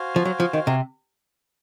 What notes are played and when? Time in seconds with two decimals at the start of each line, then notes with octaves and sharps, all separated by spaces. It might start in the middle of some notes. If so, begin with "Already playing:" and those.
Already playing: F#4 C5 F5 G#5
0.16 F3
0.25 F#3
0.40 F3
0.53 D#3
0.67 C3